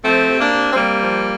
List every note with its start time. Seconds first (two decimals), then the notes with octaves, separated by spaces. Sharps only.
0.04 F3 A3 C4
0.28 C3
0.40 A#3 D4
0.53 C3
0.73 C4
0.76 C3 G3 A#3
1.01 F3